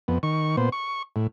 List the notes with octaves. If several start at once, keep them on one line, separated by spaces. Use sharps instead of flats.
F2 B3
D#3 C#6
A#2 B3 C5
C#6
A2